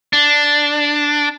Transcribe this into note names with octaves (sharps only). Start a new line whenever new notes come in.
D4